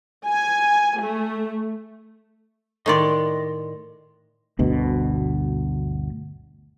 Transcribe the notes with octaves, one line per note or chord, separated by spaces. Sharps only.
G#5
A3
A2 D#3 D5 D#5 C6
G1 D2 B2